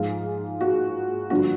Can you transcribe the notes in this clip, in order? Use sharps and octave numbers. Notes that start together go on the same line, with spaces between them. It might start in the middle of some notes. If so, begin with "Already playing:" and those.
Already playing: G#2 F3 G#3 F4
F#4
G2 D3 F3 F#4